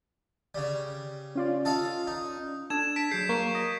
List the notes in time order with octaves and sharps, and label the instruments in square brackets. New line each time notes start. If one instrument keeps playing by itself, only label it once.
[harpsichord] C#3 G3
[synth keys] C#4 F4 D5
[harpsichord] A4 D#5 F5
D#4
[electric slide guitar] D4 [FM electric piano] A4 [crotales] G#6 E7
[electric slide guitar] A5 [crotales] B6 D7
[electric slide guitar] F#3 G#4 [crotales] G6 C7
[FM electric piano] A#3 C7 [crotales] C#6
[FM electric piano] D#5